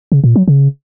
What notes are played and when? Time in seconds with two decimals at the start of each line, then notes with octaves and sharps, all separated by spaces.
0.12 C#3
0.24 A#2
0.36 F#3
0.48 C#3